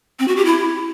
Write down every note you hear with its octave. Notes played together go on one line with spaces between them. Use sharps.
C4
F#4
G4
E4